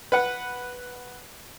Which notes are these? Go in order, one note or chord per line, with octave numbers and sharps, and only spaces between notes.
B4 F#5